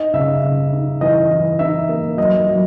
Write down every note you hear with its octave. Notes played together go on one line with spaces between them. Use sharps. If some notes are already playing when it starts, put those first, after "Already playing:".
Already playing: D#4 D#5
C#3 E5
C#3
D#4
E3 D#5
E3
D#4 E5
A#3
F#3 D#5
F#3